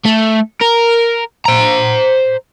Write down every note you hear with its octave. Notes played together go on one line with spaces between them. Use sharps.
A3
A#4
C5 A#5